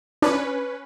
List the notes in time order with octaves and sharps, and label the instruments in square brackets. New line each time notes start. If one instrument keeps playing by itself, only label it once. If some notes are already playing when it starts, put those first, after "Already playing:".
[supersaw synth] C#4 B4 [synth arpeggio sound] D4